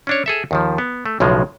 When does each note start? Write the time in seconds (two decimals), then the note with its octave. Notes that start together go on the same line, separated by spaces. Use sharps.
0.07 C#4 D4 C#5
0.26 G#4 A4 E5
0.51 D#2 D#3 F3
0.78 B3
1.06 A3
1.20 B1 A2 C#3 F3 G#3